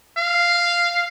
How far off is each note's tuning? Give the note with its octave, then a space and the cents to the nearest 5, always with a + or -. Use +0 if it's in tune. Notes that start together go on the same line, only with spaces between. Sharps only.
F5 -5